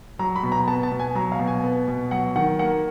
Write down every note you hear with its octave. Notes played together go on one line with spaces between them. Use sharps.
F#3 A#5
B5
B2
A#5
B3 A5
A5
B2
G#5
F#3 A#5
F5
B2
G#5
B3
B2
F#3 F#5
D#3 F#5
A#3 F#5